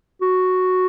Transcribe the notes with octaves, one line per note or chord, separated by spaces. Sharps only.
F#4